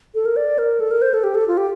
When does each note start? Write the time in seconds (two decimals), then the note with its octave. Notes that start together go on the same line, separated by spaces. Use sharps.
0.15 A4
0.25 A#4
0.36 D5
0.58 A#4
0.80 A4
0.91 A#4
1.02 C5
1.14 A4
1.24 G4
1.35 A4
1.48 F4
1.57 G4